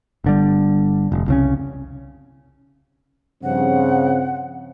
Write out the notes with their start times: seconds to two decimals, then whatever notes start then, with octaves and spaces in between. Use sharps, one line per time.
0.24 G1 D3 G3
1.12 F1
1.28 C2 C#3 C#4
3.43 G2 C#3 F3 C4 F#5